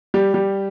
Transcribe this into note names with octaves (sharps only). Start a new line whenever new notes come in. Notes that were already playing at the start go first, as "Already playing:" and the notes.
G3 G4
G3 G4